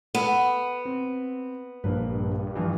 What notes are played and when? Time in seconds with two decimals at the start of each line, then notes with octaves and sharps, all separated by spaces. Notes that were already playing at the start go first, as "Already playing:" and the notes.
0.15 B3 A4 B4
0.85 C4
1.84 A#1 G2 A#3 B4
2.55 E3 F3